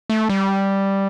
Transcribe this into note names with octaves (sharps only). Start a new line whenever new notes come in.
A3
G3